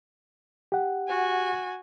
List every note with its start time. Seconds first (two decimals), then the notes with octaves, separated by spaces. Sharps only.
0.72 G4 F#5
1.08 F#4 G#5